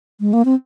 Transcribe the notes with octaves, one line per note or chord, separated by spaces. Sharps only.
G#3
A#3
C4